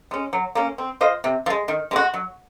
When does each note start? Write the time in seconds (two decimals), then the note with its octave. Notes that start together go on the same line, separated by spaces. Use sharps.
0.11 G#3 C#4
0.33 F#3
0.55 A#3 C#4
0.78 C4
1.01 F4 C5 D#5
1.24 C3
1.46 F3
1.50 G#3
1.68 D#3
1.91 G#3 C4
1.96 F#4
2.14 F#3